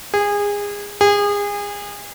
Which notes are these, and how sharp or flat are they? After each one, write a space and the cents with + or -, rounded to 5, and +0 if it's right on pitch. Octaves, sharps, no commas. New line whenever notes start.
G#4 -25
G#4 -30